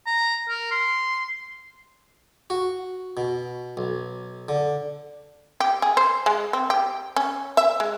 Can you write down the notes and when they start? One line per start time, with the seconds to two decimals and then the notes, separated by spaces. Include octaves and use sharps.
0.06 A#5
0.49 A#4
0.72 C6
2.50 F#4
3.17 B2
3.77 B1
4.49 D3
5.60 G4
5.82 G#4
5.97 C5
6.26 G#3
6.53 C4
6.70 G4
7.16 C#4
7.57 E5
7.80 G#3